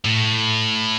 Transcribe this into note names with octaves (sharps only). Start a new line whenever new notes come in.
A2